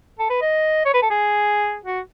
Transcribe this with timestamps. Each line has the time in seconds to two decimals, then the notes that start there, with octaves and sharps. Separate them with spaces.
0.19 A4
0.30 B4
0.42 D#5
0.85 C#5
0.94 B4
1.02 A4
1.10 G#4
1.85 F#4